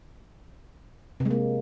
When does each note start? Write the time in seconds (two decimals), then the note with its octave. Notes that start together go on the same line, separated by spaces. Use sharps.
1.20 C3
1.25 G#3
1.31 A#3